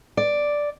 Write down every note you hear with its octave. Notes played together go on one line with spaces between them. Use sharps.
D5